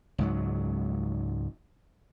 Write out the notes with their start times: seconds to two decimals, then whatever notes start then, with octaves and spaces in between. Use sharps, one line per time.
0.18 C#2 G#2 F#3